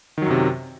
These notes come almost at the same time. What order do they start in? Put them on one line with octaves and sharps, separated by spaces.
D#3 F#3 F#2 C3